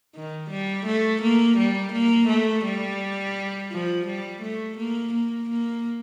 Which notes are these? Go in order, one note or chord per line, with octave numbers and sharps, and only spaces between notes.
D#3
G3
A3
A#3
G3
A#3
A3
G3
F3
G3
A3
A#3
A#3
A#3